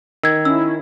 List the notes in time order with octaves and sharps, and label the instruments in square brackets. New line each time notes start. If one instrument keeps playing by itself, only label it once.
[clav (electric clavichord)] D#3 [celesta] E6 G#6
[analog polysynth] C#4 E4 [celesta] E6